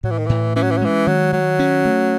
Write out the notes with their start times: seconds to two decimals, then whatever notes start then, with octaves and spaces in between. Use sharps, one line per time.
0.04 A2 F#3
0.11 E3
0.19 D#3
0.26 A2 E3
0.56 E3 C#4
0.63 F#3
0.71 E3
0.78 F#3
0.81 E3 G#3
1.07 D#3 F#3
1.32 D#3 F#3
1.59 C#4
1.85 A3